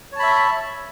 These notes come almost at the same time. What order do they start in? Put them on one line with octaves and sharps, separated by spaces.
C#5 A5 B5 E5